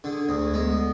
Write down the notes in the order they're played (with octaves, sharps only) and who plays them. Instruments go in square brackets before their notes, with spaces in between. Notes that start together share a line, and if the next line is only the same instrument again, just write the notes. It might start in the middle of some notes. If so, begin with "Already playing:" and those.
[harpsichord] D3 [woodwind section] G#4
[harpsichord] D2 [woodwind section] G#4
[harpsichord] G#3 [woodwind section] B3